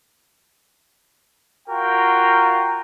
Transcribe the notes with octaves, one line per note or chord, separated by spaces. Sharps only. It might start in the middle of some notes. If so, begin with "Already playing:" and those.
F4 F#4 A#4 G5 A#5